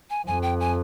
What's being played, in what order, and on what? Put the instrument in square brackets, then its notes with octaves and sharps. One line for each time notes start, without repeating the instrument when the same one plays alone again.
[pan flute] G#5
[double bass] F2 [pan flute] G#5
[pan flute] G5
G#5